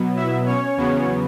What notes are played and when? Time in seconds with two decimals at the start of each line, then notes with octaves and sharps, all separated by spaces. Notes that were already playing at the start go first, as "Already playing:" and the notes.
Already playing: B2 F#3 B3
0.16 E4 E5
0.46 C#4 C#5
0.77 E2 C#3 F#3 B3